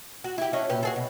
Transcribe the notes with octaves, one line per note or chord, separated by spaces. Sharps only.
F#4
E4 G4
C#4 D4 D#5
A#2 G4 B4
F#4 G#4 A4
B2